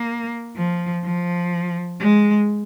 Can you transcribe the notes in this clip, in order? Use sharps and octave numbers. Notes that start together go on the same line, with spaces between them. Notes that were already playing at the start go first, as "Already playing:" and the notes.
Already playing: A#3
F3
F3
G#3